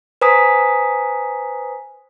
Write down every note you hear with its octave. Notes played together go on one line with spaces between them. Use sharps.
B4 C5 G#5 A#5 D#6 B6